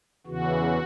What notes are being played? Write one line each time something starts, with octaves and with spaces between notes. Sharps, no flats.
E2 C#3 E3 F#4